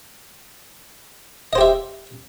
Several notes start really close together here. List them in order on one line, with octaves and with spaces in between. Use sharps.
D#5 C5 G4 E5